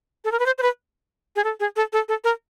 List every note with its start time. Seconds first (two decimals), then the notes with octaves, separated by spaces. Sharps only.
0.25 A4
0.32 A#4
0.39 B4
0.46 C5
0.58 C5
0.62 B4
1.36 G#4
1.44 A4
1.60 G#4
1.76 A4
1.93 A4
2.09 A4
2.24 A#4